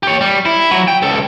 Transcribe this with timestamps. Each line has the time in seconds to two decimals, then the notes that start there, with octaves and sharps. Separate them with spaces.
0.03 G4 C#5
0.21 G3
0.46 E4
0.71 F#3
0.88 G5
1.03 C#2 A4